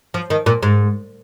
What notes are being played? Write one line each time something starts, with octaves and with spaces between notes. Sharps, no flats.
F3
D#3
A#2
G#2